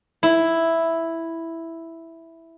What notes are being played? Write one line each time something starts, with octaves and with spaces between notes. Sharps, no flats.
E4